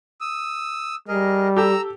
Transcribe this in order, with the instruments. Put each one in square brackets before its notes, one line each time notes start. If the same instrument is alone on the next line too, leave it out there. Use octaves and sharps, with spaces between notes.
[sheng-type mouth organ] D#6 E6
[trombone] G3 [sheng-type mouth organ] G#4 A#4 D#5
[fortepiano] G4 A4 [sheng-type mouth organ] A#5 E6